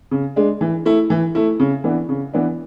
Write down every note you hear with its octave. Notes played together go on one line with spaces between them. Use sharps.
C#3
G#3 D4
E3
A3 E4
E3
A3 E4
C#3
E3 B3 D4
C#3
E3 B3 D4